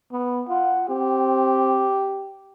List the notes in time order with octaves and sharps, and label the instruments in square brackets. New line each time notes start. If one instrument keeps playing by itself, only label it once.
[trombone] B3
[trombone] F4 [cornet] F#5
[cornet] C4 [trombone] G4